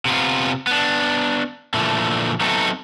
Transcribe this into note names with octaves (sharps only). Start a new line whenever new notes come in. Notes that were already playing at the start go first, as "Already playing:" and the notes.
C3 B3 F4
B3 D4
A#2 D3 E3 F3 A3
F#3 A3 B3 C4 D#4 A4